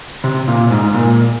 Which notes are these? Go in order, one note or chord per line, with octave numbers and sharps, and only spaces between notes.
C3
A#2
G#2
A#2